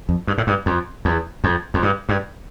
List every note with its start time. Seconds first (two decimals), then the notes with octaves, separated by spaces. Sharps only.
0.09 F2
0.27 G2
0.38 A2
0.47 G2
0.66 F2
1.05 E2
1.44 F2
1.74 F2
1.83 G2
2.09 G2